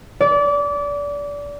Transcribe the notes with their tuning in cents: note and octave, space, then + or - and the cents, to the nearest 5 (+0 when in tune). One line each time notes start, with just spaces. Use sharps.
D5 -25